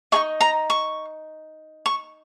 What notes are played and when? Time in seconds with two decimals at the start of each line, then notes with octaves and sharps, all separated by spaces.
0.12 D#4 G#4 D#5 C#6
0.41 A#5
0.70 C#6
1.86 C#6